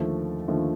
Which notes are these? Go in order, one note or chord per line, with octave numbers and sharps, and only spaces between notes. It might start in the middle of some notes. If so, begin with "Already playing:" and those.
Already playing: D#2 D3 F3 A3
D#2 D3 F3 A3